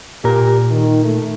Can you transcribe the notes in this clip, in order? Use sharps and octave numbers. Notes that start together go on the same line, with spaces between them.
A#2 G4 A#4
D#3
A3